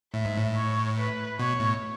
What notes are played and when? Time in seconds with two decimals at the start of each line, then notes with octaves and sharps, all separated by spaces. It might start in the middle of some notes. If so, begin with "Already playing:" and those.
0.14 A2 E5
0.25 G#2
0.37 A2
0.55 C#5
0.98 B4
1.39 B2 C#5
1.60 A2